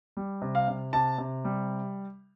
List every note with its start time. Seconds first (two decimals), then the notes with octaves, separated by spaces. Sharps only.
0.17 G3
0.42 C3
0.55 F5
0.68 C3
0.93 C3 A5
1.18 C3
1.45 G3